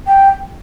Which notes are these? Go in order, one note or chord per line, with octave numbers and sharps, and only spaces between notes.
G5